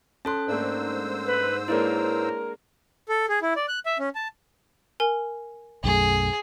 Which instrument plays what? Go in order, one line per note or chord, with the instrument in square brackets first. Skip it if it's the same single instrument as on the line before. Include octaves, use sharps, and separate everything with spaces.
[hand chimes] C#4 A4 F#6 [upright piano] A5 C6
[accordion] G#2 C5 E6 [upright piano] A3 A#3 D4
[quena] B4
[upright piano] G#3 A#3 D4 [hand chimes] E4 B4 C#5 [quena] A#4
[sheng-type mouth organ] A4
G#4
E4
D5
F#6
E5
C#4
A5
[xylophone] A#4 G#5
[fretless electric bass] B1 F#2 A3 [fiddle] G#4